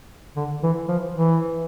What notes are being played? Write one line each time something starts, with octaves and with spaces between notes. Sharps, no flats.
D3
E3
F3
E3